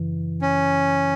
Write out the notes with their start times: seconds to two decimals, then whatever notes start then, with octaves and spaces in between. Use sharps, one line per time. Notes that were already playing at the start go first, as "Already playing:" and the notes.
Already playing: F#2 C#3 E3
0.42 C#4